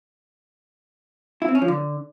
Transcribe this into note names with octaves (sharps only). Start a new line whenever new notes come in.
E4
C4
C#4
F3
D3